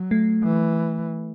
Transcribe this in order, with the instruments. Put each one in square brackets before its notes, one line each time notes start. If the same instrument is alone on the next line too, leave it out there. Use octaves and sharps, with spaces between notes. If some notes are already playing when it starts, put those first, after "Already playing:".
Already playing: [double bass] F#3
[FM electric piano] A3
[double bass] E3